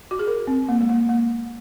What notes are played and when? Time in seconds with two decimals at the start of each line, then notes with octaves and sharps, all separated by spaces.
0.11 F#4
0.19 G#4
0.27 A#4
0.47 C4
0.69 A#3
0.81 G#3
0.89 A#3
1.09 A#3